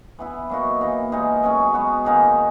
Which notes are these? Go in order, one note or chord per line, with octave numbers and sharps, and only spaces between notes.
E3 B3 E4
F#3 A#3 D#4 F#4
E3 A#3 D#4
A#2 G#3 D#4 G#4
B2 F#3 C#4 G#4
G#3 B3 F#4
D#3 A#3 D#4 G#4